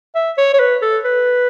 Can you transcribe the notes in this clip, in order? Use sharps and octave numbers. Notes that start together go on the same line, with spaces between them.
E5
C#5
C#5
B4
A4
B4